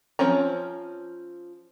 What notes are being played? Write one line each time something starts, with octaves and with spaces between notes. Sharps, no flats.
F3 C4 C#4 A#5